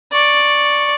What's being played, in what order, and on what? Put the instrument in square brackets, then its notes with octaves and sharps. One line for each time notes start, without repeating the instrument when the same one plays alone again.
[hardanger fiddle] D5 [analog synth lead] C#6